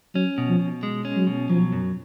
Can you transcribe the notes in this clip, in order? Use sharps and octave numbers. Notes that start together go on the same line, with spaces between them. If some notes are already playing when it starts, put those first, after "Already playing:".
F#3 C#4
B2
F3
B2
G#3
C#4
F#3
B2
F3 F#3
F#2